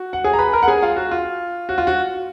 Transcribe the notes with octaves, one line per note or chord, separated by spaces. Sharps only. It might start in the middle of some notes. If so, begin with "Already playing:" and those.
Already playing: F#4
F#5
G#4 G#5
A#5
B4 B5
A#4 A#5
F#5
G#4 G#5
F4 F5
F#4
F4
F#4
F4
F#4